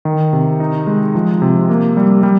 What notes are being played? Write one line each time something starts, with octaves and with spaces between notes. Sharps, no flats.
D#3
C3
D#4
G#3
F3
C3
A#3
G3
G3